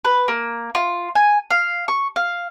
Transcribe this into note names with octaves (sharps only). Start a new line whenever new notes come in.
B4
A#3
F4
G#5
F5
C#6
F5